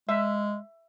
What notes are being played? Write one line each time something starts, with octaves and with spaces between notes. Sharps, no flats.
G#3 E5